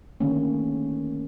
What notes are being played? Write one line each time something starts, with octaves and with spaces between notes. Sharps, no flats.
D3 D#3 A3 A#3 C#4